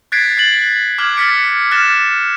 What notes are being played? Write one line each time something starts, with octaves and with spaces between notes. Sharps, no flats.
F#6 G#6 A6 B6 C7 D7
F#6 A6 F#7
D6 F6 F#6 G#6 F#7
F6 A6 B6 C#7 D7
F6 F#6 A6 A#6 E7